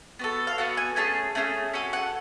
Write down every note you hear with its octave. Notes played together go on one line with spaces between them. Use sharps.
B3 F#4 A4
F5
B3 F#4 A4 F#5
G#5
A3 C#4 G#4 A5
A3 C#4 G#4
C#4 F#4 A4 G#5
F#5